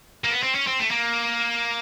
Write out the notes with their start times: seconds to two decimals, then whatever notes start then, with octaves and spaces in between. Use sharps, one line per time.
0.24 A#3
0.31 B3
0.43 C4
0.55 C#4
0.67 C4
0.80 A3
0.91 A#3